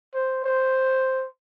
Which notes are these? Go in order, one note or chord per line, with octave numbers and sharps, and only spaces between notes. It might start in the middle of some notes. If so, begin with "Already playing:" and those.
C5
C5